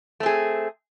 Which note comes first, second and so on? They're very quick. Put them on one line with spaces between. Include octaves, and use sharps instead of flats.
A3 C4 G#4